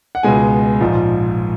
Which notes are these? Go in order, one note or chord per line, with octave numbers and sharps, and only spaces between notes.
F#5
C#2 B2 G#3 G#5
A#1 G#2 F3